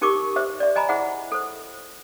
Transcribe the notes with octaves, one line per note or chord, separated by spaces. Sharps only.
D#4 G4 A#4 C#6 D6
C5 E5
D5 E5
D#5 G#5 A#5 B5
E4 G#4 C5 E5 F#5
A4 C5